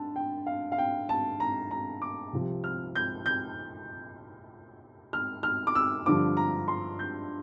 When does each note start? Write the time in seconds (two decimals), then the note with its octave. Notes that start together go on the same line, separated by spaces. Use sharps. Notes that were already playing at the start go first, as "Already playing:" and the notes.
Already playing: D3 A5
0.16 G5
0.47 F5
0.72 F5
0.78 G5
1.09 A5
1.40 A#5
1.71 A#5
2.02 D6
2.33 C2 C3 F3
2.64 F6
2.95 G6
3.26 G6
5.13 F6
5.43 F6
5.67 D6
5.75 E6
6.06 G2 D3 F3 D6
6.37 A#5
6.68 C6
6.99 G6